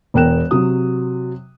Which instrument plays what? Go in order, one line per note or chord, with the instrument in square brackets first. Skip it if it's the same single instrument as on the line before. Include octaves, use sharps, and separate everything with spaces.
[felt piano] E1 E2 A#4 G5 F#6 E7
C3 F#3 D#6